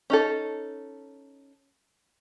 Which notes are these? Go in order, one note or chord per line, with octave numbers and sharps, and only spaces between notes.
C#4 D#4 A4